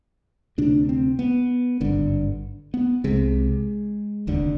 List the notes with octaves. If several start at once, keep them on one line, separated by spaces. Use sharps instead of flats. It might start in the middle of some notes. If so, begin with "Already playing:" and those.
D2 C3 D4
C4
B3
G#1 G2 D3
B3
C2 C3 G#3
F1 D#2 D3